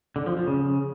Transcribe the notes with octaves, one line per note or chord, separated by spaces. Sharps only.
D3
F3
F3
C#3